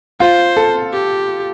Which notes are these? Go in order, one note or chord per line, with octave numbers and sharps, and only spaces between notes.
F4 C5
A4
G4